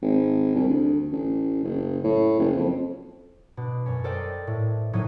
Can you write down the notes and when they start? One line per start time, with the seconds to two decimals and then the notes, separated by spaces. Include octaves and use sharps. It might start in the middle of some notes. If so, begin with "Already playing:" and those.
0.02 G#1
0.55 C2
0.69 D2
1.12 A1
1.64 F#1
2.04 A2
2.40 F#1
2.56 F2
3.57 B2 D4
3.86 F#2 C#4
4.04 A4 A#4 C5 D5 D#5 G5
4.47 A2
4.93 F#1 A2 F#3 D#4 G#6 D#7